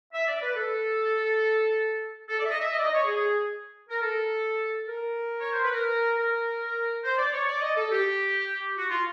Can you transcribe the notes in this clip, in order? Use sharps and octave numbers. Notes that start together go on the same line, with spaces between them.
E5
D5
B4
A4
A4
D5
E5
D#5
E5
D#5
D5
D#5
C#5
G#4
G#4
A#4
A4
A#4
C#5
C5
B4
A#4
A#4
C5
D5
C#5
D5
D#5
A4
G4
F#4
F4